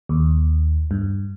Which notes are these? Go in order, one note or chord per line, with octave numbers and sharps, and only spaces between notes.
D#2
G2